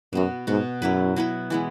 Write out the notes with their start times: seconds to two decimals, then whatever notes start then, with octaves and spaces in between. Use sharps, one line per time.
0.13 F#2 B2 B3 F#4
0.47 G#2 B2 B3 F#4
0.82 F#2 F#3 B3 E4 B4
1.16 F#3 B3 E4 B4
1.50 E3 G#3 B3 E4